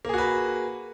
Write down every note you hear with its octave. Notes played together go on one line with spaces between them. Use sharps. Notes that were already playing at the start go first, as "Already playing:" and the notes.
A#3 F#4 G#4 B4